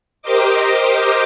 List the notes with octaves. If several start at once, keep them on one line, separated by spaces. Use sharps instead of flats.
G4 A#4 C5 D#5 D6